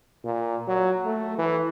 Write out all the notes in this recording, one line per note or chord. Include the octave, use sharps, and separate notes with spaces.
A#2
F#3
A3
E3